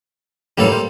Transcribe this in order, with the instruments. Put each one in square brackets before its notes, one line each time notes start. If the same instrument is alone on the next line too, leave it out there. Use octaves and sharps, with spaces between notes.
[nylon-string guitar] F#2 A2 E3 [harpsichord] G3 A#3 A4
[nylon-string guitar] C5